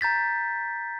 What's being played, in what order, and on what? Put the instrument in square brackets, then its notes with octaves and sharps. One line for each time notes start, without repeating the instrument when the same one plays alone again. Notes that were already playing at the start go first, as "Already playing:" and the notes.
[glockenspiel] A#5 G6 A6 B6